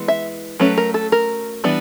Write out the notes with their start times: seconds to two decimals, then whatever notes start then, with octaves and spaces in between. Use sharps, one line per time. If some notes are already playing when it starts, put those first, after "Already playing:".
Already playing: E3 G#3 B3
0.08 E5
0.60 F#3 A3 C#4 B4
0.78 A#4
0.94 A4
1.12 A#4
1.64 E3 G3 B3 D4